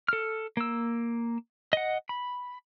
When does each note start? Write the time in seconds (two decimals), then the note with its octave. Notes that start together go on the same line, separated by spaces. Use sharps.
0.08 A4 F6
0.57 A#3 E6
1.73 D#5 F#5
2.09 B5